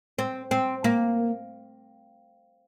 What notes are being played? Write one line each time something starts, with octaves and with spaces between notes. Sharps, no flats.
C4
C4
A#3